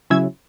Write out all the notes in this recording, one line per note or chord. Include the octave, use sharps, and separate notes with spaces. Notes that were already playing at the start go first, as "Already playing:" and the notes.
C#3 F#3 C#4 E4 E6 G#6